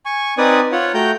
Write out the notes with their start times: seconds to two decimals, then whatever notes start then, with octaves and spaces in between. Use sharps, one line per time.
0.06 G#5 C#6
0.38 C4 D#4 B4 D5 G#5 D#6
0.72 F4 C#5 F#5
0.94 A3 F#4 G5 A#5 G6